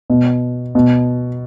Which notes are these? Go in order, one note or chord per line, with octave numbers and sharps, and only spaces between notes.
B2
B2